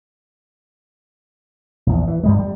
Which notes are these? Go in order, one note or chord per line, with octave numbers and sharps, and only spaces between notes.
A#1 E2
E3
G2 G3 G#3
G3